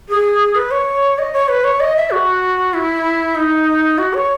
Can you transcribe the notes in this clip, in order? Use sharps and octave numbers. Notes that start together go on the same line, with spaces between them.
G#4
B4
C#5
D#5
C#5
B4
C#5
D#5
E5
F#4
E4
D#4
F#4
C#5